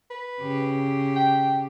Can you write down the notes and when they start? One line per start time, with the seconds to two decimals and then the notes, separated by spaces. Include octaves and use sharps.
0.10 B4
0.41 C#3 G4
1.16 G5